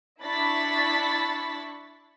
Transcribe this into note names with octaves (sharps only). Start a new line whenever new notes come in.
D4 E4 B5 C#6 A6 B6